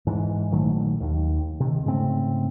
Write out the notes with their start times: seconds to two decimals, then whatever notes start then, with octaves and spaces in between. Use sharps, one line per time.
0.07 G#2 E3
0.52 A#1 D#3 F#3 A3
1.00 D#2 D#3
1.60 C3 D#3
1.86 G#2 C#3 A3 C4